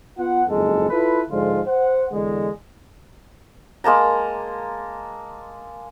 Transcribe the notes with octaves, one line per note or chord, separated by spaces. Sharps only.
B3 F4 F#5
F#1 F2 G#2 G#3 A4
E4 F4 A4 B4
G#2 D3 F3 G#3 F4
C5 F#5
E2 D3 G#3
G#3 A#3 A5 A#5